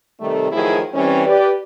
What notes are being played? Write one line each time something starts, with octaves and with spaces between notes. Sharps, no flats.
C3 D#3 G3 A3
D#3 F3 F#3 A3 E4 G#4
E3 G3 C4 C#4
G4 B4 D5